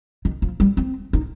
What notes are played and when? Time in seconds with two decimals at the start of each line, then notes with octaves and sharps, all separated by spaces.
0.25 D#3
0.42 F3
0.60 G3
0.77 C4
1.13 D#4